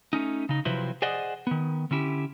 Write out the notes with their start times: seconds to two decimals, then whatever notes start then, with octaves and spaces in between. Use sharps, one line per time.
0.13 A3 C#4 D#4
0.49 C#3 D#4
0.65 C3 F3 F#3 E4 B4 C5
1.02 G#4 C5 D5 D#5 F#5
1.47 D#3 B3
1.91 D3 C#4 E4 G4